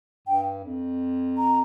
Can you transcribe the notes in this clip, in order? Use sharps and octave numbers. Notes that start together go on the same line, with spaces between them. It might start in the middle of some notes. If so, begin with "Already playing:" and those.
G2 G5
F2
A#5